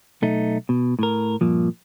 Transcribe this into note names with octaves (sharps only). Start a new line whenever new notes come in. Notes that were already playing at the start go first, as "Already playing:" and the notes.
B1 A3 D#4
B2
A2 A#4
G2 A#2 F3